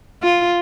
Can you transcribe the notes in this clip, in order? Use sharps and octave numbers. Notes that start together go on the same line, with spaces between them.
F4